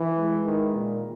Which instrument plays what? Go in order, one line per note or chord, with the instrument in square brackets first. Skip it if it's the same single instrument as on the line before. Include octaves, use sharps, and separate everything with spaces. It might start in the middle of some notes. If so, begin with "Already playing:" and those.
Already playing: [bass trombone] E3
[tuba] G#3
[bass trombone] D#3
A#2